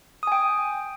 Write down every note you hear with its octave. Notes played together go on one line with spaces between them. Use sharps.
G5 G#5 D#6